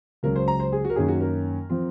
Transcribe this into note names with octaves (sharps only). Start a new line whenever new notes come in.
C#2 C#3 F#3 C#4 A#4
C5
A#5
C5
G#4
F#4
A#4
F#2 D#3 A#3 C#4 G#4
F#4
A#4
F3 C4